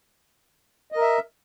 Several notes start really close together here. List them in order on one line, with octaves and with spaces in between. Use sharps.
D#5 A#4 E5